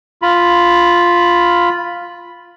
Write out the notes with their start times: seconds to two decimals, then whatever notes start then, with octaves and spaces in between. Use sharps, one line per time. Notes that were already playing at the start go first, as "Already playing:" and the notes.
0.22 F4 B5